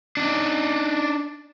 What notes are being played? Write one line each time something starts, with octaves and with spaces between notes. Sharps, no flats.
D4 D#4